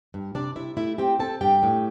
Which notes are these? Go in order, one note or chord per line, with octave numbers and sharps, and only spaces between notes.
G2
C3 D4 D5
C3 E4 E5
A3 E4 E5
C4 G4 G5
C4 A4 A5
G2 G4 G5
A2